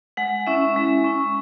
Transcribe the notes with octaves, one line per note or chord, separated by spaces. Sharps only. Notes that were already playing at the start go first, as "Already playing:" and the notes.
G#3 F#5
C#4 E4 E5
G#3
C#4 E4